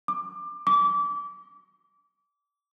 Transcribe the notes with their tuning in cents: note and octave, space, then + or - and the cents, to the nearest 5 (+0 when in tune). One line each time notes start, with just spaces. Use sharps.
D6 +25
D6 -25